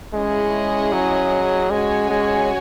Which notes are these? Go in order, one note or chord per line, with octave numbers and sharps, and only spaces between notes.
G#3 C#4 E4 G#4 D#5
F#3
G#3 C#4 F#4 C#5 G#5
G#3